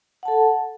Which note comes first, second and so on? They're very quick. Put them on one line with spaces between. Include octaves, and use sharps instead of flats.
F#5 A5 A4